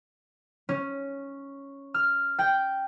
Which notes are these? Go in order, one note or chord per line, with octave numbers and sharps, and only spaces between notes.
C#4
F6
G5